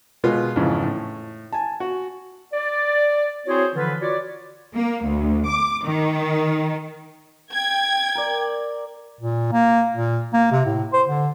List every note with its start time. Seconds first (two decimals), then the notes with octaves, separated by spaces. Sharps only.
0.24 B2 G#3 B3 F4
0.56 F2 G#2 C#3 E3
0.83 A2
1.53 G#5 A5
1.80 F#4
2.53 D5
3.47 C4 E4 F#4 G#4 C5 C#5
3.75 D3 E3 F3 F4 B4
4.01 F4 F#4 C#5 D5
4.75 A#3
5.06 D2
5.48 D6
5.85 D#3
7.52 G5 G#6
8.15 A#4 D5
9.21 A#2
9.52 A#3
9.94 A#2
10.33 A#3
10.52 C3
10.65 A2
10.93 C5
11.08 D3